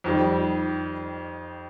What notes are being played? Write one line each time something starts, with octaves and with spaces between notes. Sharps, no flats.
F2 D#3 G3